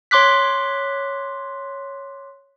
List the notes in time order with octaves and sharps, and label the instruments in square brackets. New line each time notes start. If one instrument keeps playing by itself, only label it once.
[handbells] C#5 C6 D6 F#6 B6